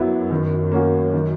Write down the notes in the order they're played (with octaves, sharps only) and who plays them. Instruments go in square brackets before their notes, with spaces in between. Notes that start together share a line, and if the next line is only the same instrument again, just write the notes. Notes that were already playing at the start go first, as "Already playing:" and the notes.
Already playing: [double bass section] F#2 [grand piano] F#3 B3 E4
[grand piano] D#3
A#3 C#4 F#4
D#3